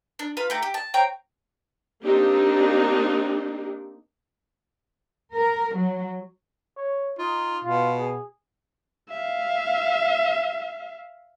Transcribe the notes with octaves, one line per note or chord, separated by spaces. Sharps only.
D4
F4 B4 F5 B5
A3 G4 A#5
G4
A5
C5 C#5 G5 A#5
A#3 C4 D4 D#4 G4
A#4
F#3
C#5
D#4 F4
B2 F4
G#4
E5 F5